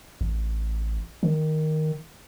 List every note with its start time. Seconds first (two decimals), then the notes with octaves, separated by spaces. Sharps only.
0.21 A1
1.23 D#3